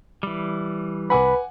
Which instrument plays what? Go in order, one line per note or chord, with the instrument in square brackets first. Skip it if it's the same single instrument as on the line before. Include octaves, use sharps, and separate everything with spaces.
[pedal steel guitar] E3 G3
[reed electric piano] C2 B5 [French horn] B4 [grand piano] F#5 G#5 D6